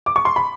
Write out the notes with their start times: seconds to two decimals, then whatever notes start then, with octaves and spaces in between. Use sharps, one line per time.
0.06 D6
0.16 C#6
0.25 C6
0.36 B5